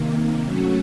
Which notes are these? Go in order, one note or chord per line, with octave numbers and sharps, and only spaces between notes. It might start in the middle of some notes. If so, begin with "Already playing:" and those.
Already playing: C3 D#3 A#3
F#3 A3 C#4 F#4